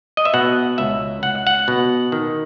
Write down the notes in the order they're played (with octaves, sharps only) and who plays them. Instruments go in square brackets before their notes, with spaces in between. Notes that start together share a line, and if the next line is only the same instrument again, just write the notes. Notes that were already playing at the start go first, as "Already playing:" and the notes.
[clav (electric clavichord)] D#5
E5
B2 F#5
C#2 E5
C#2 F#5
F#5
B2
D#3